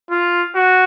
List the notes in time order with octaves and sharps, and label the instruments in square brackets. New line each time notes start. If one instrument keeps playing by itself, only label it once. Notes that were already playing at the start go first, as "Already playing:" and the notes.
[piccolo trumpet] F4
F#4